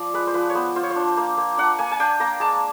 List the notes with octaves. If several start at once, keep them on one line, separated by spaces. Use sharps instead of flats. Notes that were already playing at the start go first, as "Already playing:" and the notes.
Already playing: F3 D5
G#3 B4
C5
F3 B4
C#5
B3 C5
F4 C5
C#5
C5
D4
A#3
A#3
D4 F#5
A#3 G#5
G#5
D4 G5
A#3 A#5
G#3 A5